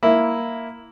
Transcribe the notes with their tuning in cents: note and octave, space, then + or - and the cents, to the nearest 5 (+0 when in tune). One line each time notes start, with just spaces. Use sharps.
A#3 +0 E4 +0